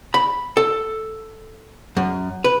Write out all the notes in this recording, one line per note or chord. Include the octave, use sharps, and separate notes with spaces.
B5
A4
F#2
B4